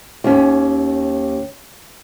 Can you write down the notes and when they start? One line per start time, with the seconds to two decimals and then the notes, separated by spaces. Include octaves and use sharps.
0.24 D#2 C#4